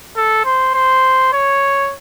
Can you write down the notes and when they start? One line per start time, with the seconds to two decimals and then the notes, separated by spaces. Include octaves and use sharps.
0.17 A4
0.45 C5
0.74 C5
1.33 C#5